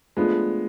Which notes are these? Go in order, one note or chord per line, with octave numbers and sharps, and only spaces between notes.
F3 G#3 A3 B3 D4 F4